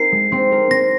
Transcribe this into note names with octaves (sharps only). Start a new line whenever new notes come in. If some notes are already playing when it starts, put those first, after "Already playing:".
Already playing: C4 D#4 A#4 C7
G#3
C4
A#4
C4 A#6